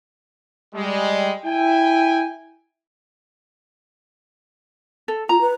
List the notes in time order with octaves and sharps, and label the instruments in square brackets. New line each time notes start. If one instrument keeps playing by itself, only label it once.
[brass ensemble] G3 G#3
E4 G5 G#5
[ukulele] A4
[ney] F4 [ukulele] A#5
[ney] B4